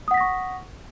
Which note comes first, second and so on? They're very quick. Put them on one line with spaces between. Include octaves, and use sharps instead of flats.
D#6 F#5 B6 A#6 C#6